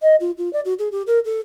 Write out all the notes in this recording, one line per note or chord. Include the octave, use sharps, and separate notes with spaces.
D#5
F4
F4
D5
F#4
G#4
G4
A#4
A4